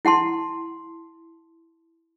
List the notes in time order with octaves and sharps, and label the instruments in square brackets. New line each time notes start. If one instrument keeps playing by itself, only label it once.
[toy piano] E4 F#5 A5 C6